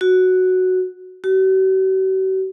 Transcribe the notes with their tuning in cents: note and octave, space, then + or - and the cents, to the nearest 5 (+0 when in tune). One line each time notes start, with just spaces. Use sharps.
F#4 +0
F#4 +45